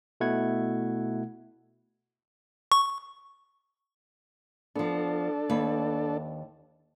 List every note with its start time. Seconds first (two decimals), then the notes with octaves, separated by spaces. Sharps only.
0.20 B2 A3 E4 F#5 G#6
2.72 C#6
4.76 F3 B3 D4 A4
5.50 D#2 B4